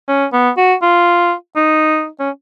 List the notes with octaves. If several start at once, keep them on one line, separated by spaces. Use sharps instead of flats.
C#4
B3
F#4
F4
D#4
C#4